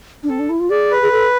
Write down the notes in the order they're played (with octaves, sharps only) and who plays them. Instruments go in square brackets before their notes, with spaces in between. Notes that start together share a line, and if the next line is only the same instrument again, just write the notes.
[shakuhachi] D4
[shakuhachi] C4 [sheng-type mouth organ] A4
[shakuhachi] D4
E4
F4
[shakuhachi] G#4 [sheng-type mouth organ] D5
[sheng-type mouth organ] B4
[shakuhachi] G#4
A4